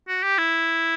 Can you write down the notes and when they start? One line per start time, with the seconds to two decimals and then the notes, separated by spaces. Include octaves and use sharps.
0.08 F#4
0.23 G4
0.38 E4